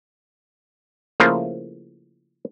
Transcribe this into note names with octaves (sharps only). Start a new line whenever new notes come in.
C#3 F3 A3 A#3 E4 F4